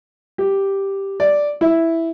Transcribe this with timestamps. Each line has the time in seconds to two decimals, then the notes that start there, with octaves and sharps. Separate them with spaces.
0.38 G4
1.20 D5
1.61 E4